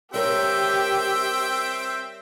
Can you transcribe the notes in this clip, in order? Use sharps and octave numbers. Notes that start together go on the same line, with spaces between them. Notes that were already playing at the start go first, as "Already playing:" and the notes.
G3 C4 G4 A#4 C#5 E5 G5